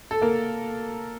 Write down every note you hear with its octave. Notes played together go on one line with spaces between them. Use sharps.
A4
A#3 A#4